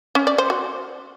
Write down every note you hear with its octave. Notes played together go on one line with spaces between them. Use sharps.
C#4
D5
C5
F#4